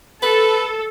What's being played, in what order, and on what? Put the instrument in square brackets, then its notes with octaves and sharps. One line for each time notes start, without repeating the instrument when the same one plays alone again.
[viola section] A4 [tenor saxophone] B4